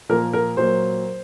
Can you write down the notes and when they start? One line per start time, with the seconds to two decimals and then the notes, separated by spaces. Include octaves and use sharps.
0.09 A#2 F3 A#3 A#4
0.33 A#4
0.57 A#2 F#3 A#3 C5